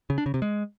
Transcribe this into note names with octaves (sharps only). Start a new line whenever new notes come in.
C#3
D4
C#3
C3
G#3